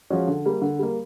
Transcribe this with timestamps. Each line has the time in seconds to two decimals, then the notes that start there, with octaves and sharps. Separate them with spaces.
0.10 F3 G#3 C#4 F#4
0.28 D3
0.45 G3 A#3
0.62 D3
0.79 G3 A#3